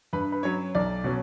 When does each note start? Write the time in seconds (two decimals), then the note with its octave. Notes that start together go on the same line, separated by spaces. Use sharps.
0.13 G2 B4
0.32 B4
0.43 F#3 C#4 C#5
0.75 B1 D5
1.04 B2 F#3 C#4